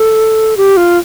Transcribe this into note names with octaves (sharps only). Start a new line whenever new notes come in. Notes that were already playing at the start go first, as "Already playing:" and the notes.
Already playing: A4
G4
F4